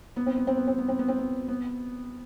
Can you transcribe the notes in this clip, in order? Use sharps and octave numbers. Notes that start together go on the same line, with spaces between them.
B3
C4
B3
C4
B3
C4
B3
C4
B3
C4
B3
B3